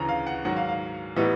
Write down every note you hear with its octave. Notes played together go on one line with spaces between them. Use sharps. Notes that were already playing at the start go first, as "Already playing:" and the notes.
Already playing: D2 C#3 E3 A#5
F5
F#5
G#2 D#3 F#3 F#5
F5
F5
A2 E3 G3 B3 D#4